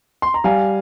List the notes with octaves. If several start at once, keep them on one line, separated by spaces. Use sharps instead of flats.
C6
A#5
G3 F5 G#5